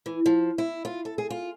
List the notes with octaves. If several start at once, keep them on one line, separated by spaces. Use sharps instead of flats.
E3
F3
E4
F4
A4
G#4
F4